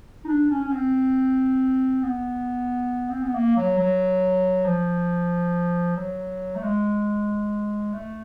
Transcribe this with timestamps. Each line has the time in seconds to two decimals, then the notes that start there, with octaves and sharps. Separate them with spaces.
0.25 D#4
0.28 D4
0.51 C#4
0.64 C#4
0.72 C4
2.03 B3
3.10 C4
3.23 B3
3.35 A#3
3.57 F#3
3.78 F#3
4.66 F3
5.97 F#3
6.56 A3
6.63 G#3
7.93 A3